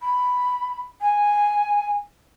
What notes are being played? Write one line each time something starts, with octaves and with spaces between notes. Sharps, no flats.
B5
G#5